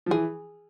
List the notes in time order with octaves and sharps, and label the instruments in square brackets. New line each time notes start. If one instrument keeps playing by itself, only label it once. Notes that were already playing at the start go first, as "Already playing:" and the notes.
[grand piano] F3
[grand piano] E3 [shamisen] G#4